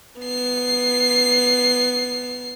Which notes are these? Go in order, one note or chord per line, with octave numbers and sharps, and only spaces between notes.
B3 C7